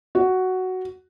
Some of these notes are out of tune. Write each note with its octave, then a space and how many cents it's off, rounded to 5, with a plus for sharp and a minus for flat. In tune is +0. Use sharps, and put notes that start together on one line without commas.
F#4 +5